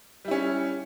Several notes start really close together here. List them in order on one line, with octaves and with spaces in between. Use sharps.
G3 E4 C#4